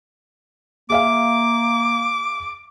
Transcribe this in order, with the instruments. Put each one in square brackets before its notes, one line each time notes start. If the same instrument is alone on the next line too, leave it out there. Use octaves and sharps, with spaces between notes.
[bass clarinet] A#3 [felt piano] G#4 E5 F5 [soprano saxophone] D6